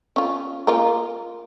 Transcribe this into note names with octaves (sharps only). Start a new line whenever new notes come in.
C#4 F4
A#3 F4 A#4